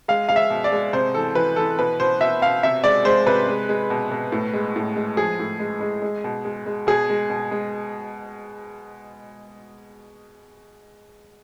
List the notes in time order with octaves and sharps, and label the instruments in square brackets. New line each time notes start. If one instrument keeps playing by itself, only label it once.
[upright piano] G#3 F5
G#3 F5
E5
B2
D5
G#3
C3 C5
E3 A4
E3 B4
E3 A4
B2 B4
B2 C5
B2 E5
B2 F5
C3 E5
G#3 D5
G#3 C5
C3 B4
G#3
G#3
B2
B2
A2
G#3
A2
G#3
F3 G#4
A2
G#3
G#3
G#3
B2
G#3
G#3
B2 G#4
G#3
B2
G#3